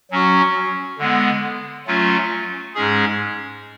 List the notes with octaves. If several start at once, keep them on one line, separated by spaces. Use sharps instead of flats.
F#3 C#4 F#4
D3 G#3 B3
F#3 A3 C#4 F4
G#2 G#3 C#4 G#4